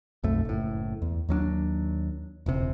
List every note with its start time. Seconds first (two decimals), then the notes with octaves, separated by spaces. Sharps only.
0.24 B1 F2 A3
0.45 F#1 A2
1.02 E2
1.29 D#2 F#3 C#4 D4
2.46 E1 C#2 C3